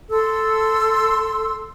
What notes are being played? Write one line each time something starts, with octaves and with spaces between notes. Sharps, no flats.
A4 C6 E6